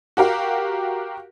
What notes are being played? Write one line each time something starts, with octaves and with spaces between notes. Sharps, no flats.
F#4 G4 A#4 F5